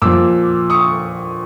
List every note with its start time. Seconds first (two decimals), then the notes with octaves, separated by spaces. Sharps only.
0.02 A#2 F3 D6 E6
0.70 C#6 D#6